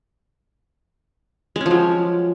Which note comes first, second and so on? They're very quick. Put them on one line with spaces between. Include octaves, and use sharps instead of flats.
G#3 C#4 F3 F#3